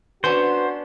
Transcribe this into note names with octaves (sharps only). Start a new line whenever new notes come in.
B3 C#4 D4 F#4 B4 C5